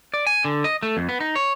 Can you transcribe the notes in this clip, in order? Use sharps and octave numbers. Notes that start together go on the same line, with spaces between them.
D5
G#5
D3
D#5
A3
F2
B3
D#4
C#5